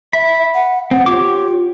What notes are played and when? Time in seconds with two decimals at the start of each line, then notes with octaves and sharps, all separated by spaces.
0.13 E5 B5
0.54 F#5
0.91 C4 F#5
1.06 F4 G4 C#5 D6